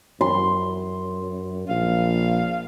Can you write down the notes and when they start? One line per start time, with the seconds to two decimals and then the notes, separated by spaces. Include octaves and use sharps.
0.21 F#2 C6
1.69 A#1 F5